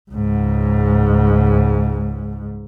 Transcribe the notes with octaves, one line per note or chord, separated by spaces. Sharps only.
C#2 G#2